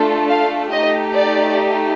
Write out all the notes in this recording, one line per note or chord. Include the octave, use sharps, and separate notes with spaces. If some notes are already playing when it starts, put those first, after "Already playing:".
Already playing: A3 D4 F4 A4
F5
A3 D#4 G4 D#5
D5